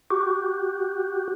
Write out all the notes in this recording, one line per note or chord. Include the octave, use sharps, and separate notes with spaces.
F#4 G4